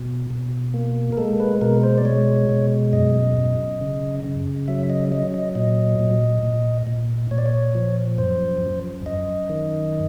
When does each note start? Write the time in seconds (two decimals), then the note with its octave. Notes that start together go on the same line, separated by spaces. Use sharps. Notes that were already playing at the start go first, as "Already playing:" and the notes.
Already playing: B2
0.31 B2
0.74 A#3
1.12 A#4
1.17 G#3 A4
1.40 B4
1.61 B2 A#4
1.83 C5
1.98 D5
2.05 G#3 C#5
2.49 B2
2.93 F#2 D#5
3.37 F#2
3.81 C#3
4.24 C#3
4.68 F#3 E5
4.90 D#5
5.12 F#3 D#5
5.34 D#5
5.55 A#2 D#5
5.99 A#2
6.43 A#2
6.87 A#2
7.31 A#2 C#5
7.38 D5
7.46 C#5
7.75 F3
8.18 F#2 C5
8.62 F#2
9.06 F#2 D#5
9.49 D#3